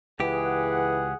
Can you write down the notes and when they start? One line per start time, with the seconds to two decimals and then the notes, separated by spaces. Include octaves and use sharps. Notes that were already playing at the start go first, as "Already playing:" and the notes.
0.20 C#2 E3 G4 G#4 F#5